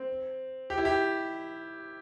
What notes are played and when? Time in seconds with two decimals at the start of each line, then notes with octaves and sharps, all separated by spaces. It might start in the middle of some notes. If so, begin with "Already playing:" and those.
Already playing: C4
0.70 G4
0.78 E4
0.85 G4